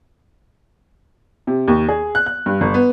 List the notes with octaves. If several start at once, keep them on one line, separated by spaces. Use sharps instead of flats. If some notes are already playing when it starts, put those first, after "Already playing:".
C3
D#2
G#4
F#6
F#6
G2
G1
B3